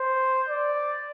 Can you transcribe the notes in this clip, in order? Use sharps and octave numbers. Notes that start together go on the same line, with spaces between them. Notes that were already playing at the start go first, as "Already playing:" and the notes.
Already playing: C5
D5